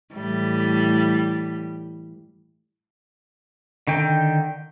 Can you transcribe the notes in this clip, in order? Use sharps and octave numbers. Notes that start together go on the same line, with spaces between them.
A2 E3 G3
D3 D#3 G5